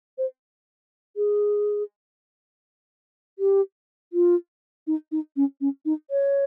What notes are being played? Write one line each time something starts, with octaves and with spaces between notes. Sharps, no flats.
C5
G#4
G4
F4
D#4
D#4
C#4
C#4
D#4
C#5